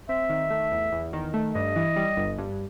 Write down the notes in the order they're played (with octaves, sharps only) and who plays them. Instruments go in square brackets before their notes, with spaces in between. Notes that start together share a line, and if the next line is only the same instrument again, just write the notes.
[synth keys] C4 [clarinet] E5
[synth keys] D#3
A3
E2
E2
D#3
A3
[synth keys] G2 [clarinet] D#5
[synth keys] E3
G3
G1
G2